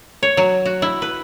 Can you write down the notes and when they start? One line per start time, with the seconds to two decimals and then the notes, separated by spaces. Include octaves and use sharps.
0.23 C#5
0.37 F#3
0.66 F#4
0.82 E4
1.02 B4